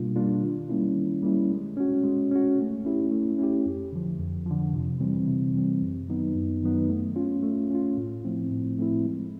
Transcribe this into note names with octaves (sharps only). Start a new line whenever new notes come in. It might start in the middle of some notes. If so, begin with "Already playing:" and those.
Already playing: B2 G3 A#3 D4 F4
G3 A#3 D4 F4
D#3
G3 A#3 C#4 E4
D#3
G3 A#3 C#4 E4
G#3
C#4 F#4
G#3
C#4 F#4
A3
C#4 E4 G4
A3
C#4 E4 G4
F2
D3 F3
F2
D3 F3
C3
E3 G3 C4
C3
E3 G3 C4
F#2
D#3 F#3 B3 D#4
F#2
D#3 F#3 B3 D#4
A3
C#4 F4
A3
C#4 F4
A2
F3 A3 C4 E4
A2
F3 A3 C4 E4
G#3